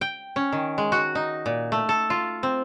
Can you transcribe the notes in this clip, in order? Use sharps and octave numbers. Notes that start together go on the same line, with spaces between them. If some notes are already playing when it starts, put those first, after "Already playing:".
G5
C#4
D#3
G#3
F#4
D#4
A#2
A3
A4
F4
C4